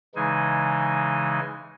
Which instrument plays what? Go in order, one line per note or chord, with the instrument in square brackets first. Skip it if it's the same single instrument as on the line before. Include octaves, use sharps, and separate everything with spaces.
[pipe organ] C#3 E3 G#3 D#4 G#5